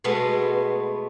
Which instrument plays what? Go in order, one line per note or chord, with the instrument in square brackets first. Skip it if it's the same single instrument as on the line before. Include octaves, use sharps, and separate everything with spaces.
[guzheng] B2 G#3 A3 B3